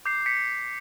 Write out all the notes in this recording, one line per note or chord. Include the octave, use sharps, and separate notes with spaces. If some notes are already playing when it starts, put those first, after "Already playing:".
D6 G6 C7
B6 C#7